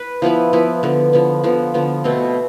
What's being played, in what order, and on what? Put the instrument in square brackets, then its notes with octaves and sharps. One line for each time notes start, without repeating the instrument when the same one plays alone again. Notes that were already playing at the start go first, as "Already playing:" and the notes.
Already playing: [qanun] B4
F3 B3 E4 B4
F3 B3 E4 B4
D3 F3 B3
D3 F3 B3
D3 F3 B3
D3 F3 B3
B2 A3 C4